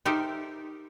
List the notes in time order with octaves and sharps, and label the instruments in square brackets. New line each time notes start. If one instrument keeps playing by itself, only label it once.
[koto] D#4 G4 A4 A#4 C5 E5